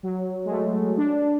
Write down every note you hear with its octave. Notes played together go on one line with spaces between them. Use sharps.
F#3
G#3
A3
D4